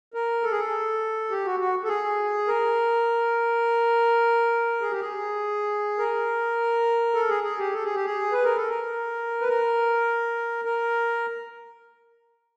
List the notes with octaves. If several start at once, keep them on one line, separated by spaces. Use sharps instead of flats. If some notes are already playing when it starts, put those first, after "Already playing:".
A#4
A4
G#4
A4
G4
F#4
F#4
A4
G#4
A#4
G#4
G4
G#4
A#4
A4
G#4
G#4
G4
A4
G#4
G4
G#4
B4
A#4
A4
A#4
B4
A#4
A#4